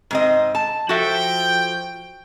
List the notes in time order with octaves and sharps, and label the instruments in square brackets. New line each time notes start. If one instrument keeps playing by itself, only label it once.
[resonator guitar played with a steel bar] G#2 C4 D#5
A5
[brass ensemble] F3 G5 [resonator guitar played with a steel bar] F#4 A4 E5